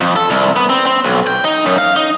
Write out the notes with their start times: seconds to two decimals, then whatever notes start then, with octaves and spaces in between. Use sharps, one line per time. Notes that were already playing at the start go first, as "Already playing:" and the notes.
0.01 F2
0.16 A4
0.30 C2
0.56 B3
0.69 C4
0.86 C4
1.05 B1
1.27 G5
1.45 D#4
1.66 F#2
1.78 F5
1.96 D#4